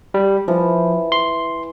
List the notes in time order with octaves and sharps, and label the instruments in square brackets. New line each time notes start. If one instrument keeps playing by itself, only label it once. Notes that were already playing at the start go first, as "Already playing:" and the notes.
[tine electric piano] G3
[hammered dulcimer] E3 [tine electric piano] F3
[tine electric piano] C6